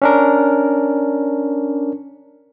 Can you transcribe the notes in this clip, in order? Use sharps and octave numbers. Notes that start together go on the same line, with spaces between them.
C#4 D4 A#4